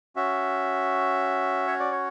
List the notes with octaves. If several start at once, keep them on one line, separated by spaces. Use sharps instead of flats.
C#4 F#4 E5
C#5
D5
C#5